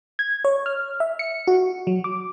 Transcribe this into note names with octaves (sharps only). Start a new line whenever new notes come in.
G#6
C#5
F6
E5
C#7
F#4
F#3
D6